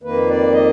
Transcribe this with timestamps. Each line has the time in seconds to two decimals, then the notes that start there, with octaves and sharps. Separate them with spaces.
0.03 F2 D#3 A#3 B4
0.28 D5
0.52 D#5